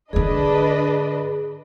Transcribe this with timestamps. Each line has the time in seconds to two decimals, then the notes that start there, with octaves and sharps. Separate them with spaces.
0.13 G#2 D3 D4 G#4 B4 D#5